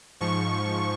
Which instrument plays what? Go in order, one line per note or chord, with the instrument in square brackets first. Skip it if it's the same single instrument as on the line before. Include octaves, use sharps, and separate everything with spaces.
[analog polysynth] G#2 F3 C#6